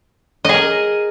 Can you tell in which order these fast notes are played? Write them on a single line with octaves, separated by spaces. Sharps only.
D#5 G#4 A#4